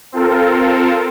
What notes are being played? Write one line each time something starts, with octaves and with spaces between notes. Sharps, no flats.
C4 F4 A4 A#4